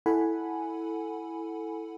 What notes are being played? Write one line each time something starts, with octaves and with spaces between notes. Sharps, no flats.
E4 A4 F#5 G#5 B5